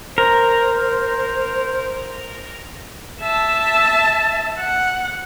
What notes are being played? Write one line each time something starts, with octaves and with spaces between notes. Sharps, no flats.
A#4 C5
E5 A5
F#5